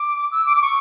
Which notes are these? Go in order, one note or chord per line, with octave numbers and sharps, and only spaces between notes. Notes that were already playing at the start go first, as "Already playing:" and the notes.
Already playing: D6
E6
D6
D6
C#6